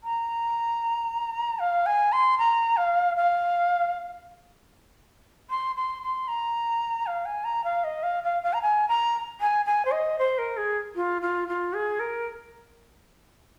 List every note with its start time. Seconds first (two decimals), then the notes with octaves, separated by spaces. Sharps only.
0.04 A#5
1.59 F5
1.86 G#5
2.12 C6
2.38 A#5
2.77 F5
3.16 F5
5.50 C6
5.76 C6
6.03 C6
6.28 A#5
7.07 F5
7.25 G#5
7.44 A#5
7.64 F5
7.84 D#5
8.03 F5
8.24 F5
8.43 F5
8.53 A#5
8.62 G#5
8.88 A#5
9.41 G#5
9.65 G#5
9.85 C5
9.92 D#5
10.19 C5
10.38 A#4
10.57 G#4
10.96 F4
11.22 F4
11.48 F4
11.74 G#4
12.00 A#4